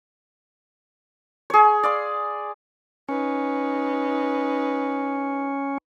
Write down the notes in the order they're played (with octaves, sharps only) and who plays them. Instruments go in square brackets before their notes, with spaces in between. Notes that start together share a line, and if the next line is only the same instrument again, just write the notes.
[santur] G#4 C#5
D5 F5 C6
[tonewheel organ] C#4 [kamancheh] D#4 B4